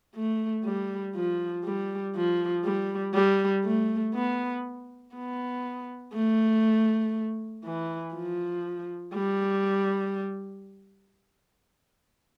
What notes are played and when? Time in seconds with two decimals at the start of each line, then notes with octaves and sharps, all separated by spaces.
0.15 A3
0.64 G3
1.15 F3
1.64 G3
2.15 F3
2.64 G3
3.14 G3
3.65 A3
4.15 B3
5.15 B3
6.14 A3
7.64 E3
8.14 F3
9.14 G3